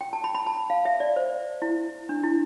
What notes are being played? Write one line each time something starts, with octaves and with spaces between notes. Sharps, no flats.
G5
A5
B5
B5
A5
F5
E5
D5
C5
E4
D4
E4